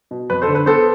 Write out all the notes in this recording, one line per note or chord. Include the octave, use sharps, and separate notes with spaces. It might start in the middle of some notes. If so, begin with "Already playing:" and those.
B2
F2 B4
A4 C5
D3
B4
B3 A4 C5